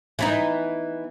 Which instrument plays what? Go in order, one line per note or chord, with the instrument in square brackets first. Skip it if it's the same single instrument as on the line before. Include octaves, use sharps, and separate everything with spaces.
[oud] E3 B3 D#4